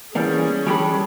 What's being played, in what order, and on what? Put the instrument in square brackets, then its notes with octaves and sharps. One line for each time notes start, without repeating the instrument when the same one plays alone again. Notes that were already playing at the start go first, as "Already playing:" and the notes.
[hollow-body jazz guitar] E3 A#3 B3 [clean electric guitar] G3 D5 [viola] C#4 G#4
[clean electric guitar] E3 D4 B5 [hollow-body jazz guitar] G3 G4 A4